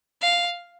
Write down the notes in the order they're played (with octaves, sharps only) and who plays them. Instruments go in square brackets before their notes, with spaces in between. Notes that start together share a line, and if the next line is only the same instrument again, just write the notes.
[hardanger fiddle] F5